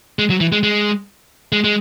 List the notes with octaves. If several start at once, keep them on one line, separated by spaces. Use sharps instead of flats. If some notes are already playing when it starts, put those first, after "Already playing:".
G#3
F#3
E3
G#3
G#3
G#3
G#3